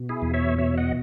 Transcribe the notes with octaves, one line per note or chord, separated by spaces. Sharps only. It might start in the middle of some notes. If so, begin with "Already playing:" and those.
Already playing: B2
E4 G#4
E2
C#5 E5
B2 C#5 E5
D#5 F#5